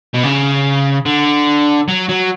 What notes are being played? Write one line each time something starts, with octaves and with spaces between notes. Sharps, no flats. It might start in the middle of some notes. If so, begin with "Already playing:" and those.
B2
C#3
D3
F#3
F#3